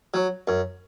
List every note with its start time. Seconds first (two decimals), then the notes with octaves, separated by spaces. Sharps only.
0.14 F#3
0.48 F#2